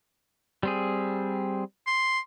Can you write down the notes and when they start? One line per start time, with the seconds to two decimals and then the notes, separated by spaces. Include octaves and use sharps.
0.63 G3 C4 G#4
1.87 C6